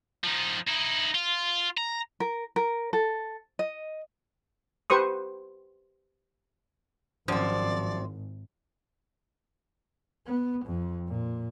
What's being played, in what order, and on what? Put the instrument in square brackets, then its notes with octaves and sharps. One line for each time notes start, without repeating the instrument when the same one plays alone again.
[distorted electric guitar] F3 D#4
D#4 E4
F4
A#5
[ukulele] A#4
A#4
A4
D#5
[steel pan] G4 B4 C5 C#6 D#6
[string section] G#1 [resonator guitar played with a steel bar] F#2 C4 [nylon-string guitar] F3 [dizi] D5
[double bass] B3
F2
A#2